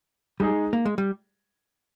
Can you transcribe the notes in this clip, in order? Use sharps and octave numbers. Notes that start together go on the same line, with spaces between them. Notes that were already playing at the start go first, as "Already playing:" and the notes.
G3 G#3 D#4 G#4
A#3
G#3
G3